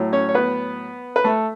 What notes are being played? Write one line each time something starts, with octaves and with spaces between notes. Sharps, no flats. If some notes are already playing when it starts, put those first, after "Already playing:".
Already playing: A2 F#3
C#4 C#5
C#5
B3 B4
B4
A3 A4